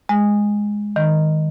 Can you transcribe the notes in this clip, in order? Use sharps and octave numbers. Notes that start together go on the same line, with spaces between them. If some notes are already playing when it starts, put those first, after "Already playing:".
G#3
D#3